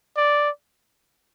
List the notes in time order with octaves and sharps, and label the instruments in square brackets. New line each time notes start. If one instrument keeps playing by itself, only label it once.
[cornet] D5